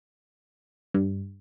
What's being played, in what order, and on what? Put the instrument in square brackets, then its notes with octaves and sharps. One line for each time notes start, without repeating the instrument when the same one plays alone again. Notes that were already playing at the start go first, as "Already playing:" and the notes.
[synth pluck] G2